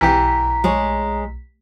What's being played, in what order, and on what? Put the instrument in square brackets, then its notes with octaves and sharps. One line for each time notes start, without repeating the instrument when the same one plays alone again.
[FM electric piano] B1 B6 [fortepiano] E3 G4 [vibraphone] A#5
[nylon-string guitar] G#3 G#4 C#5